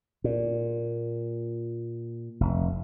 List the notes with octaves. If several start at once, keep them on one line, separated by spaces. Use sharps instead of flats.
A#2
F1